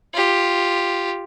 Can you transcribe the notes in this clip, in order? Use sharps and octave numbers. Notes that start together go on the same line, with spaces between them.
F4 G4